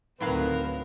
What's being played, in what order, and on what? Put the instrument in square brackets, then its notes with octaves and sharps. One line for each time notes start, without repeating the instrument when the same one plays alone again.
[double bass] D2 D#3 [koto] A2 F#3 F5 [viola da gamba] C4 A#4 [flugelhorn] B4